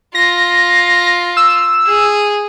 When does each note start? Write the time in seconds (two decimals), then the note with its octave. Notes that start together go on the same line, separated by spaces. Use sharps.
0.15 F4 A#6
1.37 E6
1.87 G#4